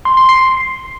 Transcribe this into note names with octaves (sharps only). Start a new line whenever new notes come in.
C6
C6
C7